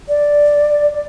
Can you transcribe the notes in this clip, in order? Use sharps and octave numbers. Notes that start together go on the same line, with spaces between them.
D5